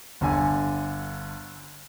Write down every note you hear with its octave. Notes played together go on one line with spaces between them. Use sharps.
G1 D3 G#5